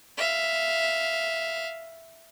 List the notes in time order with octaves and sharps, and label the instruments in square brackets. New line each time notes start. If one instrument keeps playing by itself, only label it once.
[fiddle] E5 F5